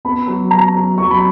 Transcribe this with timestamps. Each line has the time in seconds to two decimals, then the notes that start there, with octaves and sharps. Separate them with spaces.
0.05 B3 B5
0.28 F#3
0.51 F#3 A#5
0.74 F#3
0.98 F#3 C#6
1.11 B5